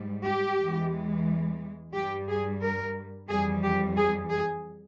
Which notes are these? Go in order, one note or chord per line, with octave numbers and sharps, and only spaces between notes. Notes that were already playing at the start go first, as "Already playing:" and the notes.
Already playing: G#2 G3
G4
E2 E3 G#3
G2 G3 G4
G#4
A#4
F2 E3 G3 G#4
G4
G#4
G#4